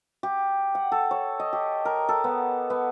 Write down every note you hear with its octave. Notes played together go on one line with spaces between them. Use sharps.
G4
F#5
A4
C#5
D#5
G4
A#4
A4
B3
B3